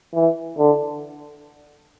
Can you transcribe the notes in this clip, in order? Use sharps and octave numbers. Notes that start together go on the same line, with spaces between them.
E3
D3